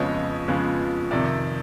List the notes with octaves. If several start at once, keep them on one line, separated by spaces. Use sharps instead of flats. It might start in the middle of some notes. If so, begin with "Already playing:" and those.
Already playing: F2 C#3 F3 G#3 B3 C#5 D#5
F2 C#3 F3 G#3 B3
F2 C3 D#3 D5 E5